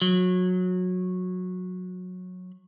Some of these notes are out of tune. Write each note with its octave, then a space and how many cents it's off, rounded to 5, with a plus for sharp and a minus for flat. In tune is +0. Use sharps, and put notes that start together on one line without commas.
F#3 -20